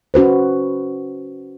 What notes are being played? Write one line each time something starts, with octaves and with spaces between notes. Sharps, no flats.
C#4 F#4 B4 C5